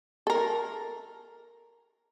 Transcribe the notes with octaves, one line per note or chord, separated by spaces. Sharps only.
A4 A#4